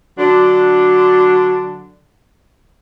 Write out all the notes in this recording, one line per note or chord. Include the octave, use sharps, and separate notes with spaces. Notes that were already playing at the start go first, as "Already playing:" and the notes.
D3 F#3 D4